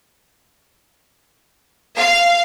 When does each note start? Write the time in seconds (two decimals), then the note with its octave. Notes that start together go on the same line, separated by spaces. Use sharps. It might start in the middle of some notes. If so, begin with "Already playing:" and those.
1.96 F5